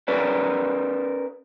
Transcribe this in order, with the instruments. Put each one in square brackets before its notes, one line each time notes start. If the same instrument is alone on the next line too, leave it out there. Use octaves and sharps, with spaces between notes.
[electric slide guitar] C#4 G#4 A#4 B4 D5